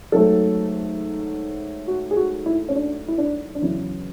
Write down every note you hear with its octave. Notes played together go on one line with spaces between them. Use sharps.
G#2 F#3 A3 A4
F#4
G#4
F#4
E4
C#4
D4
E4
D4
D4
E2 C#3 F#3 E4